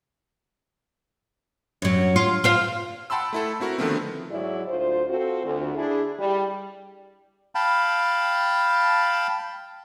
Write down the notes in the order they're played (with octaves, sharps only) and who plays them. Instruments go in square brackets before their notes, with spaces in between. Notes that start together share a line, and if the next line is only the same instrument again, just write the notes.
[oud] F#2 F#3
F4
F4 C5 F5
[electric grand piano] F#5 G5 A5 B5 C6 E6
A3 E4 A4
C4 E4 F#4 A#4
D3 D#3 F3 A3 B3 C4
[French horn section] G#2 F#3 E4 G#4 D5
D2 F4 C5
C4 F4 F#4 A4 C5
D2
D4 E4 G#4
G3
[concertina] F5 G5 A5 B5